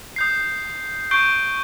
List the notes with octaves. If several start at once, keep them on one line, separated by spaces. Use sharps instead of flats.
D#6 G6 C7
C#6 G6 C7 D7 G7